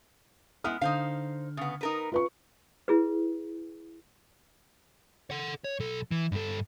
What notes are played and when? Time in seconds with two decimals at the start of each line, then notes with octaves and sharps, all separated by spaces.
0.64 G#3 B3 E4 F6
0.81 D3 D#4 C5 F5
1.57 C#3 B3
1.81 D#4 A#4 B4
2.12 F4 B4 C#6
2.88 E4 G#4 B4
5.31 A4 F#5
5.64 C#5
5.80 B1 A4
6.11 E3
6.32 G2 A4